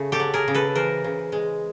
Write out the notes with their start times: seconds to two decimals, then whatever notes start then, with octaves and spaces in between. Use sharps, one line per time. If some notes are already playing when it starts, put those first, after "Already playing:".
Already playing: C#3 A3
0.12 G4 A4
0.20 F#3
0.34 G#4 A#4
0.48 C#3
0.54 A4 B4
0.75 E3 A#4 C5
1.04 C#3
1.32 G#3